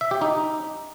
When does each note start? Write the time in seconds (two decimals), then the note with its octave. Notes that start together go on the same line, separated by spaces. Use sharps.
0.01 E5
0.11 G4
0.22 D#4